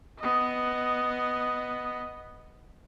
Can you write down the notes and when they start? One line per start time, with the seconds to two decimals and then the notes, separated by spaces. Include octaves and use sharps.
0.19 B3 D#5